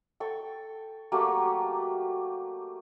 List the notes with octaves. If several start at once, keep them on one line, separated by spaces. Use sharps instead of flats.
A4 G5 C#6
F#3 A3 A#3 G4